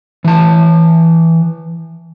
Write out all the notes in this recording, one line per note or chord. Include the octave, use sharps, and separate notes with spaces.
E3 A5